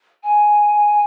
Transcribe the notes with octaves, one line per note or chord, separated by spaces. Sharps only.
G#5